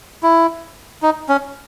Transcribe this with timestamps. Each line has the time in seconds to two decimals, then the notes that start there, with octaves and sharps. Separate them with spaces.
0.23 E4
1.02 D#4
1.29 C#4